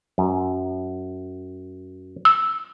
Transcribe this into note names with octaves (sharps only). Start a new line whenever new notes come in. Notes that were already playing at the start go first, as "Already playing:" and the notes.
F#2
E6